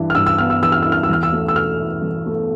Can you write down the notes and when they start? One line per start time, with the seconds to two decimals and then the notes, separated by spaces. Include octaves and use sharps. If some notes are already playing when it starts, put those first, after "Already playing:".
Already playing: G2 E3 E4
0.10 F6
0.14 G2 E6
0.26 E6
0.38 B3 F6
0.50 E6
0.62 E3 E6
0.72 F6
0.82 E4 E6
0.92 F6
1.03 E6
1.09 E2 F6
1.23 E6
1.32 A3
1.48 E6
1.56 B2 F6
1.80 E4
2.03 E2
2.26 A3